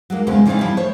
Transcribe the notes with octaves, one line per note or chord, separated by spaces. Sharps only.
F#3 G#3 A#3 D#4
E2 C#3 G#3 C4
C#3 E3 C4 D#4 D5 F5
F3 G3 E4
A3 C5 C#5